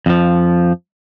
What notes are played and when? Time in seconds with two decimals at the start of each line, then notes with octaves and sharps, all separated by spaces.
0.06 F2 F3